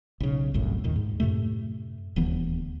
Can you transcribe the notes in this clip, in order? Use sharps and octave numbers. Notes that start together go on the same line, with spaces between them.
B1 C#3
G1 C2 F#2 A2
D#2 A#2 D#3
G#2
F#2 A2 C3 A3
D#1 D2 E3 B3